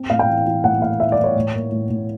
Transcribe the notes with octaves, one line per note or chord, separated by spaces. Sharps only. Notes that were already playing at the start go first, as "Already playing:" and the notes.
Already playing: C4
A2 F5
G5
E3
E3
A2 F#5
A3 F5
E3 E5
D5
E3
C#5
A2
A#3
A2
A2